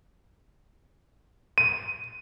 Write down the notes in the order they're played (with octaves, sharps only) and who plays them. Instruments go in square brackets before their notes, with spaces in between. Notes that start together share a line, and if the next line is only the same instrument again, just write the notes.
[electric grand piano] D#7